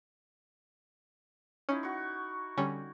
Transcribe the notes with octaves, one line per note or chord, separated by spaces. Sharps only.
C#4 D#4 E4
F#4 C#6
D3 G3 C#4